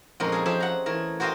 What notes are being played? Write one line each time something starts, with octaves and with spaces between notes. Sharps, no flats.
F2 A#2 G#3 C#4 A#4
G#4 A4 A#5
F3 F4 G4 G#4 E5
F#5 A#5
E3 A3 A#4
F#4 A#4 C5 D#5 F5 G5